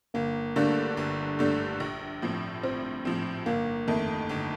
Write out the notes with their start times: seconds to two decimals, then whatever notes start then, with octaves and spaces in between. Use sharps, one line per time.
0.14 G1 A#3
0.56 G2 D3 A3 A#3 D4
0.97 G1
1.39 G2 D3 A3 D4
1.80 A#1
2.22 A2 F3 C4
2.63 A#1 C4
3.05 A2 F3 C4
3.46 G1 A#3
3.88 F2 D#3 A3
4.29 G1